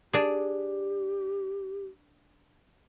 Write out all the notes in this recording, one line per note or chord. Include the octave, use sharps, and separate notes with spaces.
D4 G4 G#4